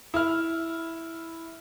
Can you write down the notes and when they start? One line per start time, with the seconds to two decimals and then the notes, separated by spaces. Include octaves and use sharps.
0.14 E4 F6